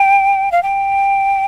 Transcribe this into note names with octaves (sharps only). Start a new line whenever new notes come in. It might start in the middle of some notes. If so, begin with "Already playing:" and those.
Already playing: G5
F5
G5